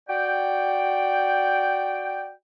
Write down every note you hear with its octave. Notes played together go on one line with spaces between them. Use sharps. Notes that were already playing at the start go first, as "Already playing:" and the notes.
F#4 D5 G5